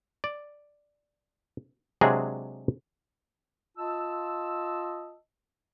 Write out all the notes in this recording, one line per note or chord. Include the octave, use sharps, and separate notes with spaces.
D5
C3 F#3 G#3 D4 G#4
F4 D#5 A5 E6